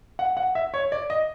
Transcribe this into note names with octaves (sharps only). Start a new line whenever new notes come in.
F#5
F#5
E5
C#5
D5
D#5